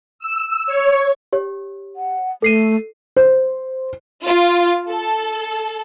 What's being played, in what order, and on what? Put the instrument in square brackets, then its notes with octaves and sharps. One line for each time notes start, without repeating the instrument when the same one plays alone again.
[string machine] E6
C#5
[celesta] G4 C#5
[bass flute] F#5
[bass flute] A3 [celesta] A4 C7 D#7
[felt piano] C5
[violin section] F4
A4